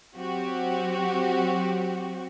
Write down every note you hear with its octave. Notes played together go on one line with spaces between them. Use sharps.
F#3 C4 F#4 G4